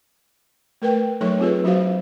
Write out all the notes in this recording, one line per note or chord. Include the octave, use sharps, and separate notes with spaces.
A3 A#4 B4 G5
F#3 A3 D#4 A4 C#5 C#6
C4 F4 G#4 B4
F#3 D4 F#4 C5 F5